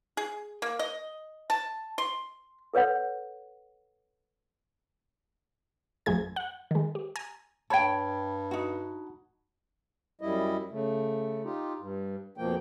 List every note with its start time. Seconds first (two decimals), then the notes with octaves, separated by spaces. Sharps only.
0.17 G#4
0.62 A#3
0.79 D#5
1.50 A5
1.98 C6
2.74 A4 B4 C#5 F#5
6.06 A1 F#2 F3 A3 G#4 G#6
6.36 F#5
6.71 D#3 G#3
6.95 G4
7.16 G#5 A#5
7.70 G2 C#5 G5 A5 B5 G#6
8.51 D#4 F#4
10.21 F#2 G3 E4 D#5
10.71 C#3 A3
11.44 D#4 F4 G4
11.79 G2
12.38 F2 B2 F3 A#3 G5